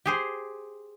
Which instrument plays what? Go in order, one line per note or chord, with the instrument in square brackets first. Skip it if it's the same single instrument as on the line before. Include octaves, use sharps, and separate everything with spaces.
[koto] G4 G#4 C5